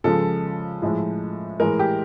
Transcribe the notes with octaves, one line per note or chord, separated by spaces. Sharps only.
C#3 F3 G#3 A4
A2 F3 G#3
A2 E3 G#3 A#4
G4